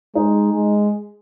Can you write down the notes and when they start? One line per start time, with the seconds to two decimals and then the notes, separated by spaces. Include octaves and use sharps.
0.15 G#3 D#4
0.54 G#3